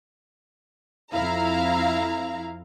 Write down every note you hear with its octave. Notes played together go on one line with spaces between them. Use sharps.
F2 E4 F5 A#5